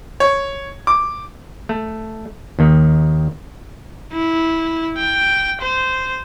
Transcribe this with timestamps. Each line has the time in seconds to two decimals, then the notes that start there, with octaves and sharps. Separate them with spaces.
0.20 C#5
0.87 D6
1.69 A3
2.59 D#2 D#3
4.13 E4
4.97 G5
5.62 C5